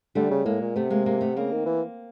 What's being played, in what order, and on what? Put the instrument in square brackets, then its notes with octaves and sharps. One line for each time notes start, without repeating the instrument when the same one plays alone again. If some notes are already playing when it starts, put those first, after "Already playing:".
[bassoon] D3 [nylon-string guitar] G3 A3
[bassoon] C#3
[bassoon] A2 [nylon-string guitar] G#3 A#3
[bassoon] A#2
[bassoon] C3 [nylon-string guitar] A3 B3
[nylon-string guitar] G#3 A#3
G#3 A#3
A3 B3
[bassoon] C#3 [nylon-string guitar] A#3 C4
[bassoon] D#3
E3